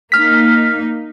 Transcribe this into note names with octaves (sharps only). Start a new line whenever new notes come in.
A#3 D#4 F6 B6